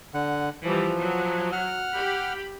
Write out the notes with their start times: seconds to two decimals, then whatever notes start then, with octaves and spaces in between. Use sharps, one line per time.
0.14 D3 F#5
0.64 E3 F3 G3
0.97 F#3
1.52 F#5 F6
1.92 G4 B5